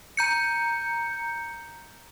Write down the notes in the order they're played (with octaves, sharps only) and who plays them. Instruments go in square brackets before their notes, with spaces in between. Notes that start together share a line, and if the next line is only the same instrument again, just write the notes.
[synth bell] A#5 G6 C#7